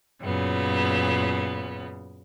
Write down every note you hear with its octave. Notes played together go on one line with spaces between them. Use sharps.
F#2 A#2 C#3 B3